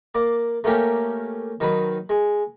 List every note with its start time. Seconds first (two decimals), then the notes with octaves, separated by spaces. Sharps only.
0.15 A#3 D5
0.64 A3 A#3 C#4 G4 A#4
1.60 D#3 F#3 B4
2.09 G#3